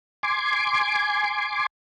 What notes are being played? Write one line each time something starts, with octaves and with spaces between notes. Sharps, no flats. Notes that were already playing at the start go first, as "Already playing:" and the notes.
G#5 C6 D6